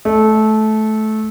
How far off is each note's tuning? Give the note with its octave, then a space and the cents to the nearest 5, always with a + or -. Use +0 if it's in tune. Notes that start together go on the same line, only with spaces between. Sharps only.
A3 -20